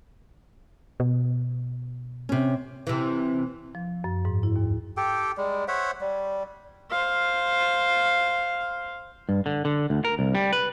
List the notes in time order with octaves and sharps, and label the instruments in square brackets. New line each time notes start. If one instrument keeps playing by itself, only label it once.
[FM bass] B2
[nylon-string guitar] C3 C#4
[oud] C3 E3
[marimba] F3
F#2
G#2
E4
D#2
[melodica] G4 A4 G5
G3 G#3
C5 C#5 E5 F#5
G3
[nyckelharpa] C5 F5
[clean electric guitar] G2
D3
D3
D2
A#4
C2
G3
B4